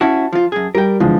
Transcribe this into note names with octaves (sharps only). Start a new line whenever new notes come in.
C#4 E4 F#4 A5
F3 F4
F#2 G#4
G3 A#4 G5
B2 D3 E3 F3 G#3